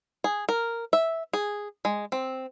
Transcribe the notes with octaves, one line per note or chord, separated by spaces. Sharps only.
G#4
A#4
E5
G#4
G#3
C4